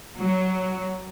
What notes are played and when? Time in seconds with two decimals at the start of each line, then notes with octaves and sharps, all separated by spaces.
0.16 F#3